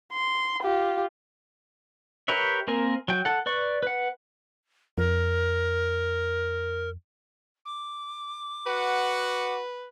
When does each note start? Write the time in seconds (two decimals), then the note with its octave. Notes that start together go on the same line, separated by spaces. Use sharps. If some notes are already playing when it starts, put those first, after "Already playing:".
0.13 C6
0.63 F4 G4
2.28 G4 A#4 B4 C#5 E5
2.68 A#3 C4 A#4 G#5
3.08 F#3 G5
3.25 A4 F#5
3.46 B4 D5 C#6
3.83 B4 F#5
4.98 F2 A#4
7.65 D6
8.66 F#4 B4 F#5